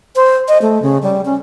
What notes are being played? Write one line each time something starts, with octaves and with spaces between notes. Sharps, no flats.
C5
D#5
A3
C#3
G3
C#4